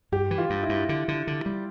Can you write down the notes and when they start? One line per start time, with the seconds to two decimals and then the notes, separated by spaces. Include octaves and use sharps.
0.12 G2 G4
0.31 E3
0.38 F4
0.50 G2
0.63 E4
0.69 G2
0.89 D3
1.08 D3
1.27 D3
1.46 G3